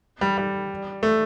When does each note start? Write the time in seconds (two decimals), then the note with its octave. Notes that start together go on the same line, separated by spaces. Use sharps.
0.21 G3
0.38 G3
1.03 A3